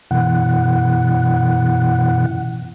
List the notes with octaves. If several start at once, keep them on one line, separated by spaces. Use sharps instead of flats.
F#2 B2 E3 F#5